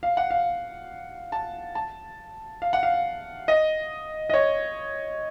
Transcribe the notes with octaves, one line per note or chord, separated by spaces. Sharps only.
F5
F#5
F5
A5
A5
F5
F#5
F5
D#5
D#5
C#5